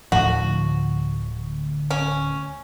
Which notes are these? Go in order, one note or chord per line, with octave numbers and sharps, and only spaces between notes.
D1 D2 A2 F3 F#4
C#4